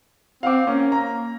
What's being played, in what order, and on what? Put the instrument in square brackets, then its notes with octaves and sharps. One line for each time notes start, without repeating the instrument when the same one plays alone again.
[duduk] C4 [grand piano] F5 F#5 D6
[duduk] A#3 [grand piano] C#4
[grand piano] A#5